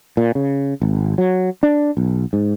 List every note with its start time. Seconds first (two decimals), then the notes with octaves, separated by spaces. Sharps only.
0.17 A#2
0.35 C#3
0.82 G#1
1.18 F#3
1.63 D4
1.97 B1
2.33 G#2